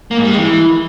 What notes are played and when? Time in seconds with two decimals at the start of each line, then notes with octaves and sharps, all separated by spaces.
0.11 A#3
0.18 G#2
0.24 G3
0.31 G#3
0.37 E3